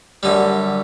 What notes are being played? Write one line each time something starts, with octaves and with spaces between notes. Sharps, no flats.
F#2 D3 G3